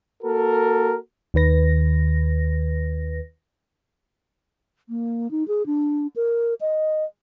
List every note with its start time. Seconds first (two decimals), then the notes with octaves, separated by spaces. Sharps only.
0.23 A#3 F#4 A4 A#4
1.34 D#2 D#3 B4 A#6
4.89 A#3
5.31 D#4
5.48 G#4
5.66 D4
6.16 A#4
6.61 D#5